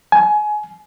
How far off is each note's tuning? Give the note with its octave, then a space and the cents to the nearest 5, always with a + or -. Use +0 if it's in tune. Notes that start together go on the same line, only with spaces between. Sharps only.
G#5 +25